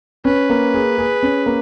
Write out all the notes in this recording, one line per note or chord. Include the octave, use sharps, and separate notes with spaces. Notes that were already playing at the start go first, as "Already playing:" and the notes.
C#4 B4
A#3
G#4
G#4
C#4
A#3